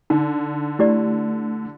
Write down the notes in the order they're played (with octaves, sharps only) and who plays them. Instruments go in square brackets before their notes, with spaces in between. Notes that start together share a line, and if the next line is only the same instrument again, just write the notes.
[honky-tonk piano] D3 [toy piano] D#4
[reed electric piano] A3 [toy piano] E4 G4 D5